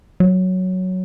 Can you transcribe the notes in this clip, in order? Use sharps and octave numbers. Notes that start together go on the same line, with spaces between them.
F#3